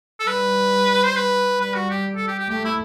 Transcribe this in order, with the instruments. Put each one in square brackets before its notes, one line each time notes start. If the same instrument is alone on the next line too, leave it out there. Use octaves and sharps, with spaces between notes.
[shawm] A4
[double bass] G3 [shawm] B4
[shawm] C5
B4
[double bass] G3 [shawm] B4
[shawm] F#4
G4
A4
G4
G4
[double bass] A3 [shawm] G4
[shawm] E4